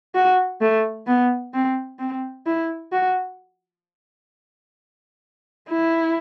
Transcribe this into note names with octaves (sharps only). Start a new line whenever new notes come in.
F#4
A3
B3
C4
C4
E4
F#4
E4